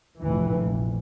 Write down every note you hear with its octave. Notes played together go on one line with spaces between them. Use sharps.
F1 A#1 F2 A2 E3
A#1